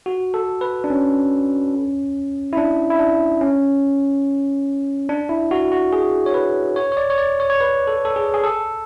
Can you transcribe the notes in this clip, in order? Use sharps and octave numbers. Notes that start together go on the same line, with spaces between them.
F#4
A4
B4
D4
C#4
E4
D4
E4
D4
C#4
D4
E4
F#4
F#4
G#4
C#5
B4
C#5
C#5
D5
C#5
D5
C#5
C#5
B4
A4
A4
G#4
G#4
A4